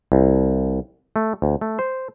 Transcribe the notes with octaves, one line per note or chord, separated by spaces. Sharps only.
C2
A3
D2
A3
C5